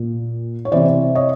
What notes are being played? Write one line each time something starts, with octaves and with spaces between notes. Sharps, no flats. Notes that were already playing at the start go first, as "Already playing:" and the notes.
Already playing: A#2
C#5
C3 E3 C5 D5
C#5 D#5